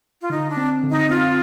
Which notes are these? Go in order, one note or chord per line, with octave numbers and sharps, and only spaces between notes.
F4
D3 D#4
D4
C4
D3
D#4
C4 F4